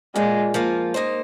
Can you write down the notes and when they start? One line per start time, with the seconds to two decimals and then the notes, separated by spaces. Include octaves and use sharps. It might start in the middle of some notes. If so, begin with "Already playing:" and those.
0.15 A#2 G#3 A#3 F4
0.54 F3 A#3 F4
0.94 A#3 D#4 C5